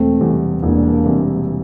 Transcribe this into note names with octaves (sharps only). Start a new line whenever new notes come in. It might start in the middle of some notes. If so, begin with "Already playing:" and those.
Already playing: E1 A3 C4
E2 C3 G3
E1 A#3 D4
E2 C3 G3